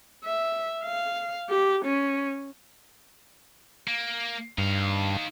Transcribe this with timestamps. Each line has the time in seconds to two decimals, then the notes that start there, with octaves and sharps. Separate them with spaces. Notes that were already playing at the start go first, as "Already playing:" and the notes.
0.24 E5
0.83 F5
1.49 G4
1.85 C#4
3.88 A#3
4.58 G2 D#4 F5